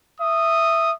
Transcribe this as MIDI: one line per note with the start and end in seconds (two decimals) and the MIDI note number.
0.21 0.92 76
0.21 0.92 87